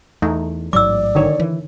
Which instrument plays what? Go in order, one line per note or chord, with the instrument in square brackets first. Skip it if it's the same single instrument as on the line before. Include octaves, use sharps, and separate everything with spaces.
[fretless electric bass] E2 [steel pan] A3 D#4
[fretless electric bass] A1 G#2 F#3 [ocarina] D5 [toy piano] D6 E6
[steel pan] D3 D#3 C#5
[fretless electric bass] E3